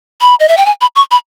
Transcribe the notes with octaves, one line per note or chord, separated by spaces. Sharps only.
B5
D#5
E5
G5
G#5
B5
C#6
B5